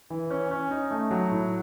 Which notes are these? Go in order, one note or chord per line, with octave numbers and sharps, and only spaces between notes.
E3
C#4
C#4
D#4
A3
F#3
A2